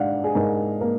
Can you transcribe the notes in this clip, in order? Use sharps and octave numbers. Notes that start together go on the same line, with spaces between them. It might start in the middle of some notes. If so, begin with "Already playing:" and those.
Already playing: G#2 D4 F5 F#5
G#4
G#2 A#4
A#3 A#4